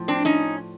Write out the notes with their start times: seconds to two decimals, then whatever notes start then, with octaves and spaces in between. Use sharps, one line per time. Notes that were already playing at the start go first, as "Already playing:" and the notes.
Already playing: A2 F3
0.08 C4 D4
0.25 C#4 D#4